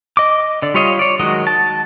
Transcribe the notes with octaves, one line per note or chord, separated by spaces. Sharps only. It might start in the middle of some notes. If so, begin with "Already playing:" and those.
D#5 D6
D3 D5
G3 F4 C#5 D#5 F5
C#5 D5
D#3 F#3 G#3 F#4 D#5
A5